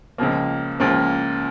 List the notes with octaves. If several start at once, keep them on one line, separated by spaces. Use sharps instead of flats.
C#2 C#3 F3 A#3
C#2 C#3 F3 A#3